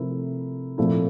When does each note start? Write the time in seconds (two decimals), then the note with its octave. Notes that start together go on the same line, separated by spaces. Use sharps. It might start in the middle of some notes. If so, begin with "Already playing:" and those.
Already playing: C3 F3 A3 E4 A#4
0.78 A#2 F3 A3 C4 E4